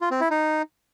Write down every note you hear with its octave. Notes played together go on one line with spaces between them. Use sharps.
F4
C4
E4
D#4